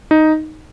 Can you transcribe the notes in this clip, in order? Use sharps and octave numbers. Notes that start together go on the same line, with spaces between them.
D#4